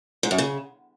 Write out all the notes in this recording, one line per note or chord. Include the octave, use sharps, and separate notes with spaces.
G#2
F#2
C#3